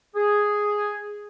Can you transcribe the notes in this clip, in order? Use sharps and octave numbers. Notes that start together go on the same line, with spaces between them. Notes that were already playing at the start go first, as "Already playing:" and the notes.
G#4